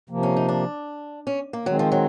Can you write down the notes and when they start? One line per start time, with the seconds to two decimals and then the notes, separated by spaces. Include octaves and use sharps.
0.10 C3 F3 A#3
0.23 C#4
0.37 D#4
0.49 D4
1.27 C#4
1.53 A#3
1.66 D#3 F#3 G#3 C4
1.79 F3
1.92 F#3